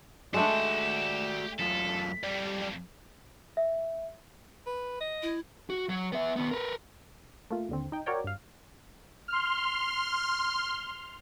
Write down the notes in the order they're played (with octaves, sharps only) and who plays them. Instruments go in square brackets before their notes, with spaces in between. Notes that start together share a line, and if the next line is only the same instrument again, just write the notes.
[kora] G#3 A3 D4 [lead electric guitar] F#4 D5 [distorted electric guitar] G4 F#5 [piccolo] E7
[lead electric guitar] F#2 F4 [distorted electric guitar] A4 [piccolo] B6
[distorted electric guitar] F2 A2 [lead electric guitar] G3 D5
[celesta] E5
[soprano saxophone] B4
D#5
[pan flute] E4
[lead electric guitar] F#4
F#3
B3 E5
D#3 B3
A#4 B4
[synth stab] A3 A#3 F4
D#2 D3 C4
D#4 G5
F#4 A#4 C#5 D5 G5
G2 F5
[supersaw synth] C6 F6